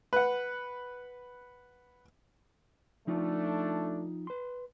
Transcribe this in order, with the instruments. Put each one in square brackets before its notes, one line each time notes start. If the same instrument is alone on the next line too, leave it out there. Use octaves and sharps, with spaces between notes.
[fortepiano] B4 F#5
[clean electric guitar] F3 D#4 F4 [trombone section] A3 D4
[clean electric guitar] B4 C6